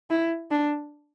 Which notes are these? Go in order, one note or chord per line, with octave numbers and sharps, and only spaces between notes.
E4
D4